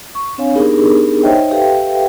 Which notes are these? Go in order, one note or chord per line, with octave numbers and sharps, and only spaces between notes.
C#6
C4 D4 C#5 F5 G#5
B3 D4 D#4 G4 G#4 A#4
D#4 C5 C#5 D#5 E5 G5
G4 A4 B4 E5 F5 G5